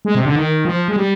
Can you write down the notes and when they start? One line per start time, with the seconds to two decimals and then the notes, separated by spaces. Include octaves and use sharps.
0.05 G#3
0.15 C3
0.25 D3
0.36 D#3
0.65 F3
0.88 G#3
0.96 G3